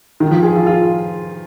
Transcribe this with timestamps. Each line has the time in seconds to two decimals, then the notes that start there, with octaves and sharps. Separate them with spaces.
0.20 D#3
0.31 F3
0.43 G#4
0.56 F4
0.67 F4